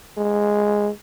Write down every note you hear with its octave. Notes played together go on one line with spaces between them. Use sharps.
G#3